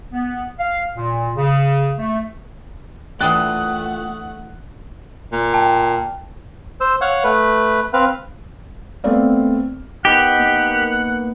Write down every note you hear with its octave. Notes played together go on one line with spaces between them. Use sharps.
B3
F5
A#2
C#3
A3
A#2 E3 A3 D4 F#5 G5 D#6 F#6
A#2
G5 A5
C5 E6
C#5 F5 F#5
A3 B4
C4 B4 F5
A3 B3 C4 D5 F5
B3 D#4 G4 F#5 G5
A#3